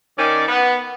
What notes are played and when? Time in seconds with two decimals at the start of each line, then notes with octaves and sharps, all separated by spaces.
0.18 D#3 C#4 D5
0.48 B3